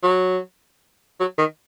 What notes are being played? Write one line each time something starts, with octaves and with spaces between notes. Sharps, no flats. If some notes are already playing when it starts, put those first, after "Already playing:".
F#3
F#3
D#3